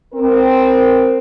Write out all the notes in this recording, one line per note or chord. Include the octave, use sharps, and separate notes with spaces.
C4 A#4